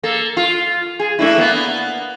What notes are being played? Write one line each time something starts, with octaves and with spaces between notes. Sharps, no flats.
A#3 A4
F4
G#4
A3 D4 E4
A#3 B3